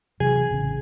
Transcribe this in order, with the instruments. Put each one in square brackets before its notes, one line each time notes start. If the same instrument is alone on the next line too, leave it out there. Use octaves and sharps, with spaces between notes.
[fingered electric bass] C3 E3 F#3 [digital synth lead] G#4
[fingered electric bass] A1 C#3